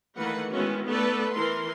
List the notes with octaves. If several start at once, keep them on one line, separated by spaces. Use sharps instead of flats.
D#3 E3 A3 A#3 B4 F#5
D#3 G#3 B3 C#4 E4 F#4
A3 B3 A4 B4 D5
E3 A#4 C6